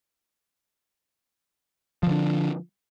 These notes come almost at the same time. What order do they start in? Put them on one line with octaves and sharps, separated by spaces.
F3 D3 D4